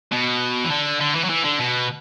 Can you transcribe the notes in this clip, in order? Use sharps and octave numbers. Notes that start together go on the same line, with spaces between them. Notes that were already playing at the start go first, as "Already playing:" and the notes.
B2
E3
D3
D3
E3
F#3
E3
D3
B2